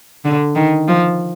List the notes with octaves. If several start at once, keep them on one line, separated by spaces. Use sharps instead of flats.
D3
D#3
F3